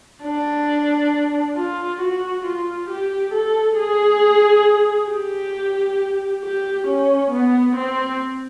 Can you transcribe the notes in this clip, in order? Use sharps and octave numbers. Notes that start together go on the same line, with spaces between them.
D4
F4
F#4
F4
G4
A4
G#4
G4
G4
C#4
B3
C4